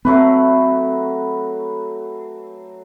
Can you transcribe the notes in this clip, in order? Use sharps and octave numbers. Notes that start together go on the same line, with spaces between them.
F#3 A3 C4 B4